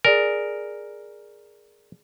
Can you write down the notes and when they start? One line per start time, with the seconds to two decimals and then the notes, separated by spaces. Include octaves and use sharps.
0.05 G#4 A#4 D5 G#5